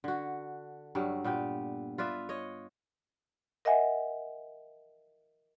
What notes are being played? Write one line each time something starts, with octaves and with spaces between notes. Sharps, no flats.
D3 F#4
G2 F#3 G3
A#2 B3 G4 G5
F4 B4 D5 E5
C#5 D#5
A#4 D#5 E5 F#5 G#5